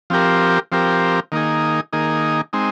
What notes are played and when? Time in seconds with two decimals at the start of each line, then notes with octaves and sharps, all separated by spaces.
0.10 F3 C4 G4 A#4
0.72 F3 C4 G4 A#4
1.32 D#3 A#3 D#4 G#4
1.93 D#3 A#3 D#4 G#4
2.53 G#3 C4 D#4